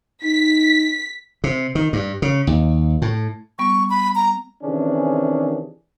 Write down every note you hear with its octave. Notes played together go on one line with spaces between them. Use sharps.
D#4 B6
C3
D#3
G2
C#3
D#2
A2
G3 B3 C#6
B5
A#5
C3 D#3 E3 C#4 D4 G#4